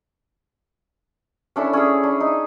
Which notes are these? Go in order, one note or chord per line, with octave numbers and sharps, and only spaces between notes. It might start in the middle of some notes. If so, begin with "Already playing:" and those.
C#4 D4 E4 A4
C#4 G#4
D4
D#4